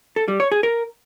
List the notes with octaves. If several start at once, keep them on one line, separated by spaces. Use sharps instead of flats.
A4
G3
C#5
G#4
A#4